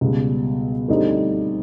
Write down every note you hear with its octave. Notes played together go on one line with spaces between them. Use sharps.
C#2 B2 G3
D2 D3 G3 C4 D#4